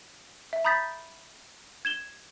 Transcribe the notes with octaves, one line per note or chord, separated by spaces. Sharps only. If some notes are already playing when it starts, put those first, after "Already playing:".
E5
A#5 B5 D#6 G6 A6 B6
G#6 E7 G7